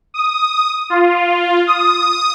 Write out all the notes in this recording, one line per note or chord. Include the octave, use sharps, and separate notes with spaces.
D#6
F4
D#6